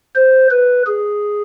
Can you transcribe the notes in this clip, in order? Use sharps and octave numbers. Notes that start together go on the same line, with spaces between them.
C5
B4
G#4